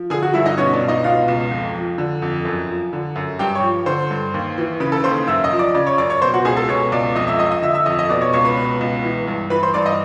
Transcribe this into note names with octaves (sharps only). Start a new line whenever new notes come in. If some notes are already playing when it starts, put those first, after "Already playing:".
Already playing: F3
D3 G#4 G#5
F#4 F#5
G2 E4 E5
D#4 D#5
B2 C#4 C#5
D4 D5
C#2
D#4 D#5
B2 F4 F5
C#2
F2
F3
D3
F2
F#2
F3
D3
F#2
G2 G4 G5
C#5 C#6
F3
D3 C5 C6
G2
D#2
E3
C#3 B4 B5
A4 A5
D#2 C5 C6
F#2 E5 E6
D#5 D#6
F3
D5 D6
C#3 D5 D6
C#5 C#6
F#2 D5 D6
C#5 C#6
B2 C5 C6
F#4 F#5
C#2 G#4 G#5
A4 A5
B2 C#5 C#6
C#2 D5 D6
F2 D#5 D#6
E5 E6
F3 D#5 D#6
D#5 D#6
D3 E5 E6
E5 E6
F2 D#5 D#6
D#5 D#6
B2 D5 D6
C#5 C#6
C#2 C#5 C#6
B4 B5
B2
C#2
E3
G2
E3 B4 B5
C5 C6
G2 D5 D6
D#5 D#6